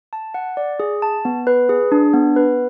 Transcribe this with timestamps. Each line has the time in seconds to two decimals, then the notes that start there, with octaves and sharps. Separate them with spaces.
0.13 A5
0.34 F#5
0.57 D5
0.80 G#4
1.02 A5
1.25 B3
1.47 B4
1.69 G#4
1.92 D4
2.14 B3
2.36 B4